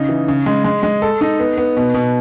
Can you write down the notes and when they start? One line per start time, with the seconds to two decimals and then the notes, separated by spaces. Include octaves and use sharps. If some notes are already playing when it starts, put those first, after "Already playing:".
Already playing: C#3 D#4
0.09 E3
0.28 C#3
0.46 G#3
0.64 G#3
0.83 G#3
1.02 A4
1.21 D#4
1.39 B3
1.57 B3
1.77 B2
1.94 B2